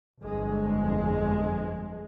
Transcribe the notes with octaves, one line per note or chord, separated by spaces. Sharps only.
G1 F2 G#3